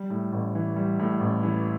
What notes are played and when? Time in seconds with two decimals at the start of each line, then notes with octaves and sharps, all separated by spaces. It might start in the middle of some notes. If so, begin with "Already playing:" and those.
Already playing: G3
0.10 A2
0.32 A1
0.55 E3
0.76 G3
0.99 A2
1.21 A1
1.43 E3